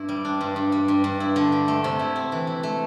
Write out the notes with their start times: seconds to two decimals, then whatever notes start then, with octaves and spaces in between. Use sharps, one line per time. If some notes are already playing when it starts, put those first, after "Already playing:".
Already playing: G2 E4
0.09 G3
0.25 D4
0.41 G2
0.56 G2
0.72 G3
0.88 G2
1.04 G2
1.20 E4
1.36 D3
1.52 G4
1.68 A3
1.84 C3
1.99 E4
2.16 C4
2.32 E3
2.47 E4
2.63 A3